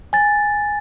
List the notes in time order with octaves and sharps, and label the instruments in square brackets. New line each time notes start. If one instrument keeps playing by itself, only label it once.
[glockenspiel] G#5 A6